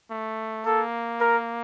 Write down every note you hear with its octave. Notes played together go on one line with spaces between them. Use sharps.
A3
A#3 A4
A#4